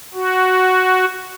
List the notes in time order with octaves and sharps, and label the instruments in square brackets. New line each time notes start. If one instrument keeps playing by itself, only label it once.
[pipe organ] F#4